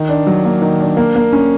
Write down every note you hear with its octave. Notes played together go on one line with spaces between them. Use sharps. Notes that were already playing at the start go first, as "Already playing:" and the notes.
Already playing: D#3
D4
F#3
A#3
D#3
D4
A#3
A#3
C#4